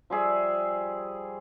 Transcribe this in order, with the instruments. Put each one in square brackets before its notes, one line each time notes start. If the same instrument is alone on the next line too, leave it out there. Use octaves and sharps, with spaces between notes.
[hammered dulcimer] F3 G3 G#4 E5